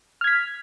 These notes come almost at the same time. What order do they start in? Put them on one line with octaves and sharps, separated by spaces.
F6 G#6 B6